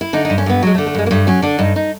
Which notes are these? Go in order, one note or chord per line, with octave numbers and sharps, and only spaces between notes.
E4
D3 D#4
D#4
G2
C#4
G2 B3
F#3 G#3
A3
D3
A3
G2 G#3
A#3
G2 A3
F#3 C#4
D3 D4
G2 D#4
D#4